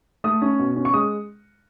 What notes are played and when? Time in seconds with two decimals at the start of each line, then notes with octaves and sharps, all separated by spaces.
0.24 A3 D#6
0.42 C#4
0.59 B2
0.76 C#4
0.85 C#6
0.93 G#3 D#6